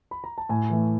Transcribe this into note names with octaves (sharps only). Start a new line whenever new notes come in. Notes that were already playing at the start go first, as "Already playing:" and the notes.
B5
A#5
A5
A2 G#5
E3 A3